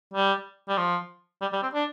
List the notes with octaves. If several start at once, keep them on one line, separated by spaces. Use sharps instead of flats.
G3
G3
F3
G3
G3
C4
D4